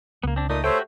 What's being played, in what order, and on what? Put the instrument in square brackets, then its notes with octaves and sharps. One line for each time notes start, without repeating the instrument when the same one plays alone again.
[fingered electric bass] C#2 [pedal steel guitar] A#3 B3
[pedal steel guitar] C4 D4
[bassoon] A#2 [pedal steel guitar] A3 D#4 [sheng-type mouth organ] D#6
[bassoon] A3 [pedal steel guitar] F#4 G4 G5 [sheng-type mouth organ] C5 C#5 E5